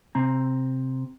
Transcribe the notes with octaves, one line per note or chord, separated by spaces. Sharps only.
C3 C4 A#5